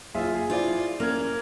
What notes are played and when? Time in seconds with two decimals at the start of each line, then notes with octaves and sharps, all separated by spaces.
0.14 F#1 F4 G#4 E5
0.35 G#4
0.50 E4 F4 C5 D5
1.00 A#3 C#4 F6 G#6